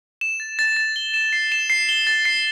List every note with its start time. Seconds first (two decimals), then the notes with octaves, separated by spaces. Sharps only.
0.21 E7
0.40 A6
0.59 A6
0.77 A6
0.96 G7
1.14 E7
1.33 C7
1.52 E7
1.70 C7
1.89 G7
2.07 A6
2.25 C7